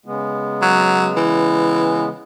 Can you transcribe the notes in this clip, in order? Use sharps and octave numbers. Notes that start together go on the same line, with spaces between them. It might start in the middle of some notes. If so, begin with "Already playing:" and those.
C#3 G#3 B3
F#3
E3